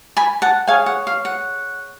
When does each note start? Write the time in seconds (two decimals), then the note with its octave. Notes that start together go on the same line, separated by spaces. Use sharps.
0.17 G#5 B5
0.42 F#5 A5
0.67 G#4 C#5 F5 G#5
0.86 F#5
1.07 F5
1.25 F#5